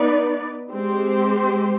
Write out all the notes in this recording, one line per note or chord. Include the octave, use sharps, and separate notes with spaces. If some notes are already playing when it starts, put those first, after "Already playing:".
Already playing: B3 D#4 B4 D5
G#3 C4 G4 C5